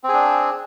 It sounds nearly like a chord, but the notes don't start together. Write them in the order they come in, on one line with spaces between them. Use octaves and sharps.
C4 G#4 D4